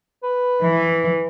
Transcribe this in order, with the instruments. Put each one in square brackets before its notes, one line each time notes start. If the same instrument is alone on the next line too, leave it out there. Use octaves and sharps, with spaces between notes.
[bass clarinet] B4
[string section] E3